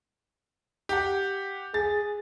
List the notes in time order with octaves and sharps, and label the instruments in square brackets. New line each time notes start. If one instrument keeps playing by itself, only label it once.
[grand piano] G4 F#5
[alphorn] G#4 [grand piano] A6